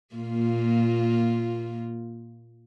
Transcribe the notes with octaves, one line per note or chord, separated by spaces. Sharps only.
A#2 A#3 F4